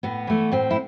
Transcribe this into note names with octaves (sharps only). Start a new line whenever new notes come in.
A2 B3
E3 A3
A2 C4
E4